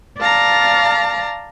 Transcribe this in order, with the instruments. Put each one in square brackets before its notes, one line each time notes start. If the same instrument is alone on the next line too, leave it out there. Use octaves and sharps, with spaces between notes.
[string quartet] D5 F5 A5 A#5